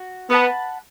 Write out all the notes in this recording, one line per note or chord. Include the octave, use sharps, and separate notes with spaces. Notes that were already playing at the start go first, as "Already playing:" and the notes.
Already playing: F#4
B3 B4 F#5 A5